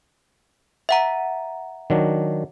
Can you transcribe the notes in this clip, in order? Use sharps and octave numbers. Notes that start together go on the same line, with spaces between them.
E5 F#5 A#5
D#3 F#3 D4